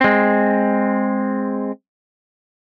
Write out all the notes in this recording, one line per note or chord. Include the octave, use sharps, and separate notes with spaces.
G#3 C4